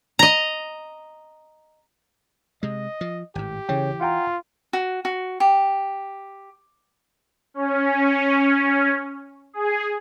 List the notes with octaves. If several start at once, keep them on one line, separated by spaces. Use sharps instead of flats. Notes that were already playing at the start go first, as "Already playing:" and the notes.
D#5 A#5
C3 G#3 D#5
F3
G#1 A2 G4
C#3 E3 C#5 G5
F4 F#5 G5 A#5
F#4
F#4
G4
C#4
G#4